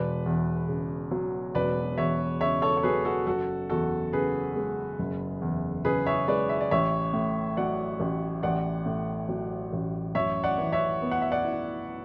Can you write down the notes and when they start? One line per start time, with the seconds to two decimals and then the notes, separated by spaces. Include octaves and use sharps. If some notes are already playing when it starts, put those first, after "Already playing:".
Already playing: E1 B4 D5
0.26 E2
0.68 C#3
1.11 F#3
1.55 E1 B4 D5
1.97 E2 C#5 E5
2.40 C#3 C#5 E5
2.62 A4 C#5
2.77 C#5
2.83 F#3 G#4 B4
3.05 F#4 A4
3.27 F#1 F#4 A4
3.70 E2 F#4 A4
4.13 C#3 G#4 B4
4.56 G#3
4.99 F#1
5.42 E2
5.85 C#3 G#4 B4
6.07 C#5 E5
6.28 G#3 B4 D5
6.49 E5
6.61 D5
6.71 A1 C#5 E5
7.13 A2
7.57 F#3 D5 F#5
8.00 A1
8.43 A1 D5 F#5
8.86 A2
9.29 F#3
9.73 A1
10.15 F#2 C#5 E5
10.43 D5 F#5
10.58 E3
10.72 C#5 E5
11.02 B3
11.11 F#5
11.21 E5
11.32 D5 F#5
11.44 E4